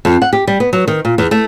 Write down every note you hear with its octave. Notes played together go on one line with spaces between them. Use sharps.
F2
F#5
G4
G3
B3
F#3
D#3
A#2
E2
A3